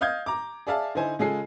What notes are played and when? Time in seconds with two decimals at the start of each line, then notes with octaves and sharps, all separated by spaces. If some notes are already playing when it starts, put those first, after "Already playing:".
0.01 D#5 F5 D#6 G6 G#6
0.26 A#5 D6
0.67 G#4 D5 E5 F5 A5
0.95 D3 D#4 E4 C5 G#5
1.19 C#3 G#3 F4 G#4 A4 C7